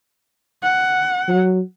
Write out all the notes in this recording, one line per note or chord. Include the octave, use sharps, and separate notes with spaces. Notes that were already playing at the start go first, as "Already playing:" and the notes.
F#5
F#3